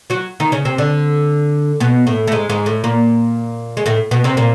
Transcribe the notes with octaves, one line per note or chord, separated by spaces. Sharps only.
F#3 F#4
D#3 D#4
C#3 C#4
C3 C4
D3 D4
B2 B3
A2 A3
A3
G#2 G#3
G#2 G#3
A2 A3
A#2 A#3
G#3
A2 A3
B2 B3
C3 C4
A#2 A#3